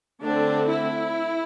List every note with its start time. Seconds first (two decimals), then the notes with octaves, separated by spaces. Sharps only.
0.22 D3 A3 C4 D4
0.68 E4